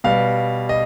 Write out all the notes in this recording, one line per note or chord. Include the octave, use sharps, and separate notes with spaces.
B2 G3 F5
D#5